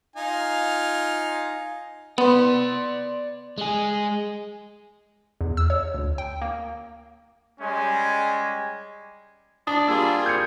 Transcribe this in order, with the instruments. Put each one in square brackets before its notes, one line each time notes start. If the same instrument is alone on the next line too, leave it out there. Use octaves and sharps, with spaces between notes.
[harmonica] D#4 F4 G#5
[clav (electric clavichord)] B3 [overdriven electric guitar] D5 C6
[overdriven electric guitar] G#3 G#4
[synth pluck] E2
E6
C#5
D2
G5
A#3
[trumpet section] G3 G#3 C#4 G4 G#5
[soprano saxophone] D4 [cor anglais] D5 [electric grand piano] D#6
[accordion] G3 A#3 F4 [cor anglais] G#4 [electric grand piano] E6
[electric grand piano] G6 G#6 C#7